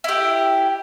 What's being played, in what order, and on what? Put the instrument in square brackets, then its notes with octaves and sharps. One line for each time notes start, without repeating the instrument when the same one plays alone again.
[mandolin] E4 G4